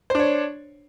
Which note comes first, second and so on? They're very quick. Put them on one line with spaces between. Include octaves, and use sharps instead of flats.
C5 D4 C#5